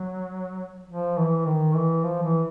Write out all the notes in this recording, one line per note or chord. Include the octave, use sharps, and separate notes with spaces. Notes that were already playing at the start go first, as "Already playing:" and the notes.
Already playing: F#3
F3
E3
D#3
E3
F3
E3